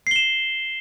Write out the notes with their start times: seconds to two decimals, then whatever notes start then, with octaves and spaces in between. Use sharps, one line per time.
0.07 C7
0.11 G7
0.16 E7